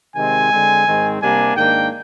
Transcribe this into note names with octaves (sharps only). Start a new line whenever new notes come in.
C3 D#3 G#3 C4 G#5
D3 G#3 C4
G#2 D#3 G#3 C4
C3 G3 A#3 D4 G#5
G#2 D#3 A#3 D4 G5